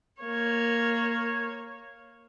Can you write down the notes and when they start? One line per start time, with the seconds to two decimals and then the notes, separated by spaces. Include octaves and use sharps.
0.22 A#3 C#5